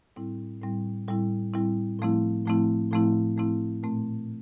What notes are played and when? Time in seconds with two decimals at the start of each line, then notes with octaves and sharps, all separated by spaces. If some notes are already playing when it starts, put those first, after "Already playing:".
0.16 A2 G3 C4 E4
0.62 A2 G3 C4 E4
1.08 A2 G3 C4 E4
1.54 A2 G3 C4 E4
1.99 A2 F3 A3 C4 E4
2.45 A2 F3 A3 C4 E4
2.91 A2 F3 A3 C4 E4
3.37 A2 F3 A3 C4 E4
3.83 A#2 A3 C4